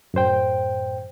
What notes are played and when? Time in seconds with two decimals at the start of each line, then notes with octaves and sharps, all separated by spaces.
0.14 F#2 A2 C5 G5